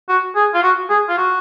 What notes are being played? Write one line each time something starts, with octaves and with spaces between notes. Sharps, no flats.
F#4
G#4
F4
F#4
G#4
F4
F#4